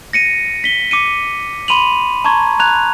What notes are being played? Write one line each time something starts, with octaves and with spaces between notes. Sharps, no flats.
A#6 C#7 D#7
B6 G7
D6 C#7 D#7
B5 C6 D#7 F7 F#7
A5 A#5 C6 C#6 G#6
A#5 F#6 G#6 F7